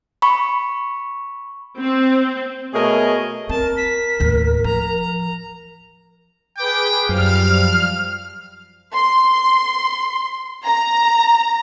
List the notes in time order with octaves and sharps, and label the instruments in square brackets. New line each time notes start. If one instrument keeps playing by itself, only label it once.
[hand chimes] B5 C#6
[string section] C4
[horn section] B2 A3 G#4 A#4 C#5 D#5
[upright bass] C4 [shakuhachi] A#4 [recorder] A5
[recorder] B6
[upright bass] D#2 A2
[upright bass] F3 [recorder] A#5
[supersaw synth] G#4 B4 D6 [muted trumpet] G5
[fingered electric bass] F#2 [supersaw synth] F3 G3 [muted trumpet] F5 [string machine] F6
[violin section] C6
A#5